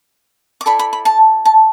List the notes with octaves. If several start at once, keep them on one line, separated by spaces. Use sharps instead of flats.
D6
E4 A4 D5 B5
B5
B5
A5
A5